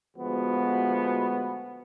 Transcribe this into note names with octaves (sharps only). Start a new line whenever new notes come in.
D2 F3 G#3 B3 F#4